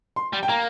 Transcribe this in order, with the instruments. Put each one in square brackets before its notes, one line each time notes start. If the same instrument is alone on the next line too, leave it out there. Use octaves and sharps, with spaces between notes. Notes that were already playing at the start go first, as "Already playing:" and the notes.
[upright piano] C6
[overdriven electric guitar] G3
[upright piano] G5
[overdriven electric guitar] A#3 [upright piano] A#5